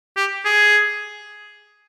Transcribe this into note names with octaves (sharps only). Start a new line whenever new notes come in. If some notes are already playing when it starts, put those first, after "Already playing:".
G4
G#4